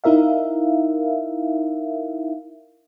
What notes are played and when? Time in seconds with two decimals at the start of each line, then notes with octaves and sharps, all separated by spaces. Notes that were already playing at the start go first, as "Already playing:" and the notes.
0.04 D#4 E4 A#4 E5 F5